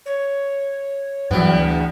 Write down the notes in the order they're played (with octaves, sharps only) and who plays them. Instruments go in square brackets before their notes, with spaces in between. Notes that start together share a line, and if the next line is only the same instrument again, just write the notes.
[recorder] C#5
[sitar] E2 B3 [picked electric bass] G2 F#3 [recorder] G5
[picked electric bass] D2